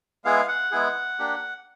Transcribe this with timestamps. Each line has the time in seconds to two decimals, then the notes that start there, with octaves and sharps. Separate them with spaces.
0.25 G#3 B3 E4 G#4 F5
0.48 F#5
0.71 G#3 B3 E4 G#4
1.19 A#3 D4 G4